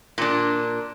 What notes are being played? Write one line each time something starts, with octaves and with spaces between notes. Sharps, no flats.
A#2 D4